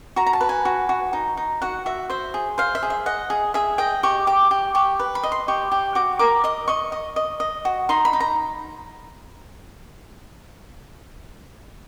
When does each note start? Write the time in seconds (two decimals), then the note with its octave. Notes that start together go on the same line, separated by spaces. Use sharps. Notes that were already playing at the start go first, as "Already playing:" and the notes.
0.16 F#4 A#5
0.26 A#5
0.33 A5
0.41 B4
0.49 G#5
0.65 F#4
0.89 F#4
1.13 D#4
1.37 D#4
1.62 F#4 F#5
1.86 F#4 E5
2.10 C5 E5
2.34 G#4
2.58 C5 F5
2.75 E5
2.83 G#4
2.90 E5
3.06 D#5 F#5
3.30 G#4
3.54 G#4 E5
3.78 D#5 G5
4.03 G4 C#6
4.27 G4 D6
4.51 G4
4.75 G4 C#6
4.99 B4
5.15 B5
5.23 D#5
5.32 C6
5.48 G4 C#6
5.72 G4
5.95 F#4 D6
6.19 A#4 D6
6.44 D#5 D#6
6.68 D#5 C#6
6.92 D#5
7.16 D#5
7.40 D#5
7.65 F#4
7.89 D#4 C6
8.05 B5
8.13 D#4
8.20 A#5